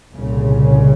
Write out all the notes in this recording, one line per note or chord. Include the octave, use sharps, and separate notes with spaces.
C2 A#2 C#3